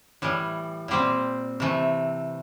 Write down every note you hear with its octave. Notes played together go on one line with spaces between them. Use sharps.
A2 E3 G3
A#2 G3 C4 G4 C5
C3 E3 A3